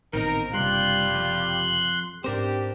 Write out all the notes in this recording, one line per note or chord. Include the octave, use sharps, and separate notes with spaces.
A1 A#2 D#3 B3 C4 D#4 A#4
F#1 G2 C3 G3 F4 G4 C6 F#6
F2
G#2 C4 D4 G4 A#4 C5